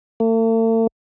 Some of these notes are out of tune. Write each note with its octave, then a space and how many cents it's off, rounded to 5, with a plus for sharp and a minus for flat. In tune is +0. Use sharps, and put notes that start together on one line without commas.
A3 +45